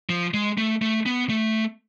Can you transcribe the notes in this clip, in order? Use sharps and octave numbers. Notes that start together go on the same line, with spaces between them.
F3
G#3
A3
A3
B3
A3